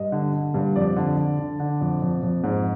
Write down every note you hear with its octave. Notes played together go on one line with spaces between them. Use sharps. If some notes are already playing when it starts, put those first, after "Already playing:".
Already playing: G2 D#5
D3
D3
G2
F2 D5
D3
D3
D3
D3
F2
F2
F2
G#2